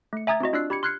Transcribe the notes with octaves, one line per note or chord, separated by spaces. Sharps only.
A3 C#7
E5 G#5 A#5 D#6 G#6 A6
C4 E4 F#4 D#5
D4 F4 D5 E6 F#6 C7
G4 B5 G#6 C#7
C6 F6 F#6 G#6 C7 C#7